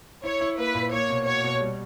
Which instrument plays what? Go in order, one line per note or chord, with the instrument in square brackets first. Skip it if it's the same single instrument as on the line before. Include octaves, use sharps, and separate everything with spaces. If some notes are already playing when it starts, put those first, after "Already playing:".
[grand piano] E4 [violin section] C#5
[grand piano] E4
[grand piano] A#3 [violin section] B4
[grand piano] A#2
[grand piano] A#3 [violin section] C#5
[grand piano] B2
[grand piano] F#4 [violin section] C#5
[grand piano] B2
G3